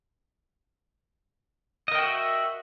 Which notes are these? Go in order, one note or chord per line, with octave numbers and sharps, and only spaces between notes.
F#4 A#4 D#5 E5 G5